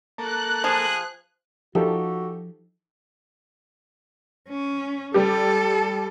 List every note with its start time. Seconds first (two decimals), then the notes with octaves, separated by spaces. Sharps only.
0.18 A#3 A4 F#6
0.64 F3 G#4
1.75 F3 D#4 F#4 G4 A4
4.48 C#4
5.14 G3 G4 A4